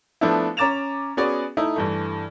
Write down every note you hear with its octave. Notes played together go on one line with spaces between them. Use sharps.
F3 A3 B3 D4 E4
C#4 A#5 D6 A6 E7 F7
B3 C#4 F#4 G#4 D5
A3 D#4 E4
G2 E3 A3